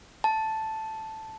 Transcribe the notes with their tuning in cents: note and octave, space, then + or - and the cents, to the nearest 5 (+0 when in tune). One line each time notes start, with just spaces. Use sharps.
A5 +0